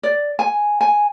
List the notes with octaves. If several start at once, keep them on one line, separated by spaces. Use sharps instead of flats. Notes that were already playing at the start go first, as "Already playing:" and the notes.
D5
G#5
G#5